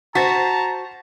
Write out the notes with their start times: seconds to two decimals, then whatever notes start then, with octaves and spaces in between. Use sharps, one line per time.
0.15 F#4 C5 A5 A#5 A6 B6